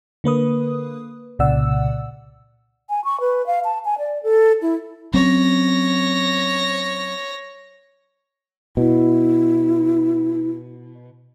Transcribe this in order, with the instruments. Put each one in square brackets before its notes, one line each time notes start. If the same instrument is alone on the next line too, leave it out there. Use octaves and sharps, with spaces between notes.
[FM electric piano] D3 A#3 B4 D#6
C2 A#2 C#3 D5 F#5 E6
[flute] G#5
C#6
B4
F5
A5
G#5
D5
A4
E4
[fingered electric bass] F#3 C4 C#4 [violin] C#5 A#6
[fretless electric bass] B2 [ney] E4